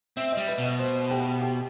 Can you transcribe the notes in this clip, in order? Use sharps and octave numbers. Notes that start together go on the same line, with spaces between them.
C4 E5
G3 D#5
B4
B2
D#5
C5
G4
G4